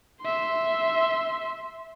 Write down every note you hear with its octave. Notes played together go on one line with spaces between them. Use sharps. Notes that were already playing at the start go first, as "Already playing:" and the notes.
E5 C6